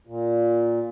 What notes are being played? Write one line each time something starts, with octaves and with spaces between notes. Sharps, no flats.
A#2